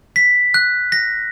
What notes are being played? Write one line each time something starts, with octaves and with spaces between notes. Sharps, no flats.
B6
F#6
A#6